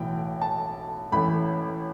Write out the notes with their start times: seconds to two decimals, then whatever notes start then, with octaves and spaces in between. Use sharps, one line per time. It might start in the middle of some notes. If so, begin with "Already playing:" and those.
Already playing: B1 A2 E3 G5
0.41 A5
1.12 A1 A2 E3 A3 B5